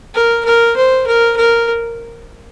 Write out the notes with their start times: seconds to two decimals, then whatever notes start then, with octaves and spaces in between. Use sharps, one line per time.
0.14 A#4
0.45 A#4
0.76 C5
1.07 A#4
1.37 A#4